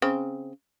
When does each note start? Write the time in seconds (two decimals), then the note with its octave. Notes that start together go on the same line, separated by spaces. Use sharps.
0.02 C#3 C4